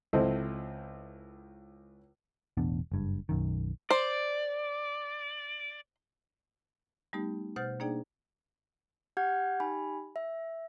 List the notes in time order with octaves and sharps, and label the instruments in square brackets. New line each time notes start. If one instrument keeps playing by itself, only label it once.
[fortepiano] C#2 C4 E4 A4 C5 D#5
[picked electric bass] E1 A1 B3 D4
F#1 G2
B1 F#2 D#3
[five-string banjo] C5 [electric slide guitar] D5
[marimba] G3 A3 B3 D#4 G4
B2 C5 F#5 F6 G6 A6
A#3 D4 D#4 G#4 D5 G5
[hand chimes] G4 F#5 F6 G6 G#6
D#4 G4 G#5 B5
E5